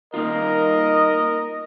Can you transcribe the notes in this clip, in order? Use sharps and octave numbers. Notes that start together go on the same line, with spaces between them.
A#3 D#4 F4 A#4 D#5